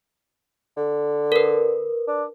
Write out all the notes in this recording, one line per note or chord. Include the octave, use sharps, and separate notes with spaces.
D3
A#4 B4
D4